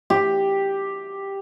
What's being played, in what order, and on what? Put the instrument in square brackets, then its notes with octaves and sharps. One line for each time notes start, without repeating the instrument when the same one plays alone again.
[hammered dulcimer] G4